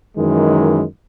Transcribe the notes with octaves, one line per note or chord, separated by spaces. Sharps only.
F#2 D#3 E3 G#3